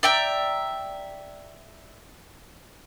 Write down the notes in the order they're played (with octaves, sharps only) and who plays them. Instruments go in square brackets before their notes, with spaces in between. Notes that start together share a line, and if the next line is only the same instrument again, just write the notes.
[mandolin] D5 E5 G5 A#5